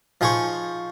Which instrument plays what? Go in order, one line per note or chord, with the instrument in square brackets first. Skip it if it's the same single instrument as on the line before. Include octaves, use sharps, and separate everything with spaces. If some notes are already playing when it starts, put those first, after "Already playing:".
[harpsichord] F3 D#4 G#4 C5 C#6